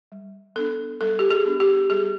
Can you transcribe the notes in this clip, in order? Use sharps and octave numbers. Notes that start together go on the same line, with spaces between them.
G3
B3 D4 A4
G3 A4
G4
G#4
B3 D4
G4
G3 G#4